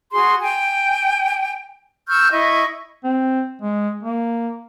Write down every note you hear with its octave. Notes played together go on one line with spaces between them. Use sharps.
F#4 G#4 C6
G5 G#5
C#6 E6 F6 G6
E4 D#5 C#6
C4
G#3
A#3